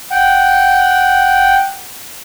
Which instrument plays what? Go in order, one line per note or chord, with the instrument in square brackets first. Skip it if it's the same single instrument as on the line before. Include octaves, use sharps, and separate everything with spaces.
[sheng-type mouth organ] F#5 G5